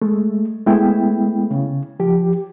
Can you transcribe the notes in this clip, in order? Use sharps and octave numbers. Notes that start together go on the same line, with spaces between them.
G#3 A3
G#3 A3 B3 E4 G5
C#3
F3 G4